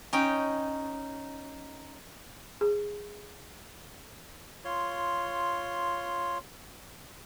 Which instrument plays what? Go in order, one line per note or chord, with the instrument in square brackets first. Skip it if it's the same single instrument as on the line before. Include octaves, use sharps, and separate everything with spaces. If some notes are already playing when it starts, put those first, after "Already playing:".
[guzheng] C#4 D#4 G5
[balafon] G#4
[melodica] F4 C#5 C6